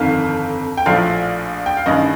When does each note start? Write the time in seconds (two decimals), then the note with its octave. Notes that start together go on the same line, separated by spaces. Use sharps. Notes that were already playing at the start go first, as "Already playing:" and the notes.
Already playing: G1 F2 D#3 F5
0.77 G5
0.86 A#1 A2 F3 F5
1.66 G5
1.77 F5
1.86 A1 G2 D#3 D#5